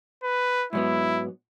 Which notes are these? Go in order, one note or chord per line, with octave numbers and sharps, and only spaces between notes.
B4
G#2 F#3 B3 E4